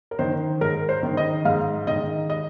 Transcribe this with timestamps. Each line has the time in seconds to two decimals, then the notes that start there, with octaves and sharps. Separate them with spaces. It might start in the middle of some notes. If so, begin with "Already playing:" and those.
0.11 A#4
0.19 D#3 C5
0.61 G#2 A#4
0.89 C5
1.03 D#3
1.17 D#5
1.45 G#2 F5
1.87 D#3 D#5
2.30 D#5